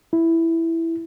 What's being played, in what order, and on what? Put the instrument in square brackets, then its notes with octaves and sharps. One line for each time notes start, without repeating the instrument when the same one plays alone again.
[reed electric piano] E4